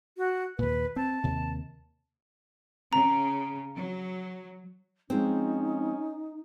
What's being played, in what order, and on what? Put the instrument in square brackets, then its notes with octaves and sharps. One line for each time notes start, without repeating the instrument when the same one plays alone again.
[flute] F#4
[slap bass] D#2 A#2 [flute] B4
[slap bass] C4 [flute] A5
[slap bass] D#2 C3
[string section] C#3 [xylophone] A#5
[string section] F#3
[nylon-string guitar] F3 G#3 C4 [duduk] C#4 [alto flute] D#4